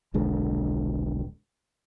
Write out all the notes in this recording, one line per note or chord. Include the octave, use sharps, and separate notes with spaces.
D#1 B1 D3 G#3